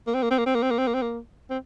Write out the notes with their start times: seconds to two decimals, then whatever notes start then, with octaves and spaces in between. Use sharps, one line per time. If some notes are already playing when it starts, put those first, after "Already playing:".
0.07 A#3
0.15 C4
0.23 A#3
0.31 C4
0.38 A#3
0.46 C4
0.55 A#3
0.63 C4
0.71 A#3
0.78 C4
0.87 A#3
0.94 C4
1.02 A#3
1.50 C4